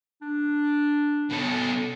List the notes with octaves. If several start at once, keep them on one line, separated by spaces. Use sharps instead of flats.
D4
B2 A4